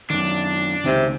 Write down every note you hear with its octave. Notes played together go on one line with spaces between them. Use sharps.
F#2 D#3 D4
C#2 C3 D#3